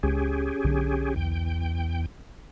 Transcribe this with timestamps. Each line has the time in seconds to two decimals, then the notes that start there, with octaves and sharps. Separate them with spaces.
0.03 C#2 C#4 G4 G#4
0.64 B1 D3
1.16 E2 G5